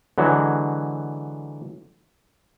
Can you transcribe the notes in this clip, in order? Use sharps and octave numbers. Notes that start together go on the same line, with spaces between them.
D3 E3 F#3 G#3 F#4